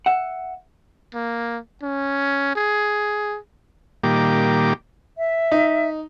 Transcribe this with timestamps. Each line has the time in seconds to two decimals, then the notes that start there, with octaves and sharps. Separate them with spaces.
0.06 E5 F#5
1.14 A#3
1.82 C#4
2.56 G#4
4.04 A#2 D#3 G3 A#3 G4 D6
5.17 E5
5.52 D#4